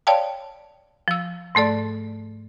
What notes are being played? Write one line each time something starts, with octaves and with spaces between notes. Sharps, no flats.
C#5 D5 F5 G5 A5
F3 E6
G#2 A3 A4 D5